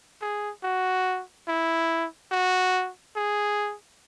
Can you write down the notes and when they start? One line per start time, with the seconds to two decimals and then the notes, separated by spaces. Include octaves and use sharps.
0.21 G#4
0.63 F#4
1.48 E4
2.31 F#4
3.16 G#4